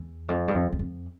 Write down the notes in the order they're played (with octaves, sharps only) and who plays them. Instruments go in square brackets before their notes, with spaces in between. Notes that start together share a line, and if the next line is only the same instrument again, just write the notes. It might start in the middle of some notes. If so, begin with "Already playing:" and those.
Already playing: [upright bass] E2
F2
G2
F2
E2
F2